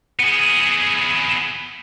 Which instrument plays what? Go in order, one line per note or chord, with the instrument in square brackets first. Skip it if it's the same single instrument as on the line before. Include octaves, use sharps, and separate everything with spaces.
[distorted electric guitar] B3 G#4